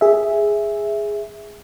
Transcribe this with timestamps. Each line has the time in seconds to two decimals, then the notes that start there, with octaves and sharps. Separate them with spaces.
0.01 G#4 E5